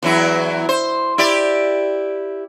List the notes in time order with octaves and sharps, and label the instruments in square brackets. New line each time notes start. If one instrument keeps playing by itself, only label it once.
[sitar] E2 F#3 E4
C5
E4 G4 D5